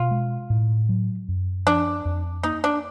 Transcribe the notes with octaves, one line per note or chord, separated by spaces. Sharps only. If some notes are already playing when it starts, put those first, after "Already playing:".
Already playing: B2 F4
G#3
A2
F#3
F#2
F3 D4
F2
A#3 D#4
D4